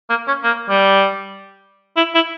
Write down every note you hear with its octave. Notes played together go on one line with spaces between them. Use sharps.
A#3
C#4
A#3
G3
E4
E4